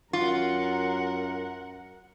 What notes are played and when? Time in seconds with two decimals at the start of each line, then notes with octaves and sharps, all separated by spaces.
0.13 F#2 F4 A#4 F#5